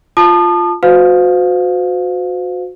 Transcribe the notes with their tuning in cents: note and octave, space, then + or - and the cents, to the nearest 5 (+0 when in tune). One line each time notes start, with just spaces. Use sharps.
F4 +0 A5 +0 D#6 -40
F#4 -25 C5 -40 F5 +20